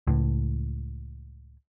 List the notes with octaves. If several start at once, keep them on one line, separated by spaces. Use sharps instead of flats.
C#2 A2